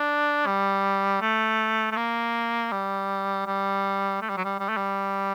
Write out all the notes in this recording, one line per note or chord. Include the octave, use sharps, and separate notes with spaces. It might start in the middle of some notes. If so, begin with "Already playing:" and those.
Already playing: D4
G3
A3
A3
A#3
G3
G3
A3
G3
F#3
G3
G3
A3
G3